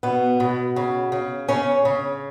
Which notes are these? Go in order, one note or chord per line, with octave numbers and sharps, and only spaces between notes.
B2 B3
B2
C#3
C#3
C#3 C#4
C#3